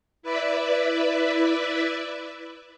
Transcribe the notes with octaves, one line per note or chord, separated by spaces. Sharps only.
E4 B4 D5 E5